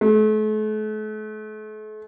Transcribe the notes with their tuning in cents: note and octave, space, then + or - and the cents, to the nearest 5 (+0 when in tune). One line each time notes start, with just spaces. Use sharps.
A3 -40